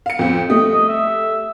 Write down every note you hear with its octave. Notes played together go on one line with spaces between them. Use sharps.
F5 C#7
F2 C4
G3 A3 D#5
D#5
E5